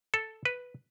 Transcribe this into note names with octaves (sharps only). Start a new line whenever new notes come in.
A4
B4